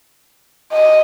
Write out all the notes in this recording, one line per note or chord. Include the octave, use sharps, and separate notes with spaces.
D#5